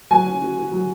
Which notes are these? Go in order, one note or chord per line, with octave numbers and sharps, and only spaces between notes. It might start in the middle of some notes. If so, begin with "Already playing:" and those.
F#3 G#5
C#4
F#4
F#4
F#3